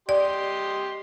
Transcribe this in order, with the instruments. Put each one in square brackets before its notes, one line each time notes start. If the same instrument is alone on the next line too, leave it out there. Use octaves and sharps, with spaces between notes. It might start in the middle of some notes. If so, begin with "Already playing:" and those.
[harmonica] G4 D#5 C6 [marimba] D5